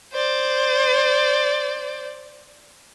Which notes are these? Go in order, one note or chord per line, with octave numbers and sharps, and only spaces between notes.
C5 D5